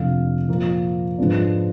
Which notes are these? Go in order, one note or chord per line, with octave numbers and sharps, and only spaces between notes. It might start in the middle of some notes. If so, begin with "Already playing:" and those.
Already playing: F2 C3 F3 A3 D4 F4 F5
A#2 F3 A#3
G#2 F3 G#3 B3 D4